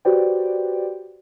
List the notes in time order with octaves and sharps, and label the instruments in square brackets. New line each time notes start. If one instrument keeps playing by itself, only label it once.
[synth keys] F#4 G4 B4 C5 D5 G5